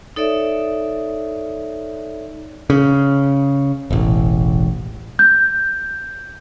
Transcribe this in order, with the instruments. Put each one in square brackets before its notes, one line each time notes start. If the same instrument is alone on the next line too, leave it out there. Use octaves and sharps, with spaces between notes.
[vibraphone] D#4 A4 C#5 D5 E5
[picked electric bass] C#3
E1 A1
[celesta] G6